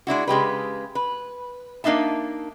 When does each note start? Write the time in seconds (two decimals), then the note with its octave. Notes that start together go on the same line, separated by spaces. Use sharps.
0.07 G#3 D4 E4 F#4
0.28 C#3 G#3 G4 B4
0.95 B4
1.84 A#3 D4 D#4 E5 A5